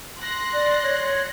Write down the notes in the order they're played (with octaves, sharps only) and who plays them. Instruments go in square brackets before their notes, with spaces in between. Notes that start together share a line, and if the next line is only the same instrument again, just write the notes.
[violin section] C6 F#6 A#6
[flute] D5
C#5